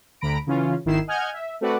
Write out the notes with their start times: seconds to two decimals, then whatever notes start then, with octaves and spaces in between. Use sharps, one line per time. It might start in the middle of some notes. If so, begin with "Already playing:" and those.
0.21 D2 D3 A#5 B5 A#6 D7
0.47 C#3 E3 C#4 F4
0.85 G#1 D#3 E4 C7 E7
1.07 D#5 F#5 G#5 F6 G6 G#6
1.33 E5
1.61 A3 C4 F#4 B4 D5 F#5